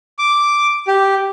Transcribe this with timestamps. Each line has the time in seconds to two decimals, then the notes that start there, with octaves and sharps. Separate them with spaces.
0.19 D6
0.88 G4